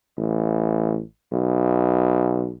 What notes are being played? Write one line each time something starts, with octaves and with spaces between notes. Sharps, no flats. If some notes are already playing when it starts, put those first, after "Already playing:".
A1
B1